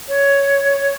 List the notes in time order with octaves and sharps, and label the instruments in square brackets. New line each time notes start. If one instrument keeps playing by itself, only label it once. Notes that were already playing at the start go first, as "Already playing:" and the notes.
[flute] C#5